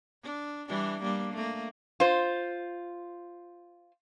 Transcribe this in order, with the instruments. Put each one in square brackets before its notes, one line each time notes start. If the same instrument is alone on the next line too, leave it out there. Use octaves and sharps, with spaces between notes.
[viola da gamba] D4
E3 G3 D4
G3 A#3 D4
A3 A#3
[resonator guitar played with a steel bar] F4 C5